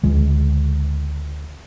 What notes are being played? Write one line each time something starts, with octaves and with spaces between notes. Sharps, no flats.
D2 C#3 G#3